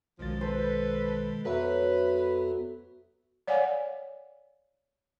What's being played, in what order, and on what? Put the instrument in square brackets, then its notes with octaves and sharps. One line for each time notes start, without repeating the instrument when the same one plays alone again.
[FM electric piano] B1 A6 [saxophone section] F#2 F3 [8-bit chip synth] B2 D#3 G#3
[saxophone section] A4 B4 [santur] C5
[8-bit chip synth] F2 B3 [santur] F#3 [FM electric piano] A4 E5 [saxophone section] B4
[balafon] C#5 D5 F5 F#5 G#5